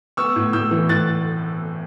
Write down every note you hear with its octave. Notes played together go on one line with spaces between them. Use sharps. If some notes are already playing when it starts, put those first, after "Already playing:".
B3 C#6 E6
A2
A2 E6 G6
E3
A2 F#6 A6